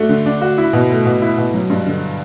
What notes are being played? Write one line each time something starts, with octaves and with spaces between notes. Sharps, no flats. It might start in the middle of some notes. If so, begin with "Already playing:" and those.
Already playing: A3 D4 F#4
D3
D4
F#4
E4
B2
A3
B2
E4
B2
F#3
G2
D3